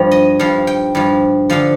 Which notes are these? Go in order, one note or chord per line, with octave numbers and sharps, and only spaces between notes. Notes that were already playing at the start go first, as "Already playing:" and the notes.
Already playing: G2 F3 C5
D#5
G2 F3 F5
G5
G2 F3
D3 F3 F5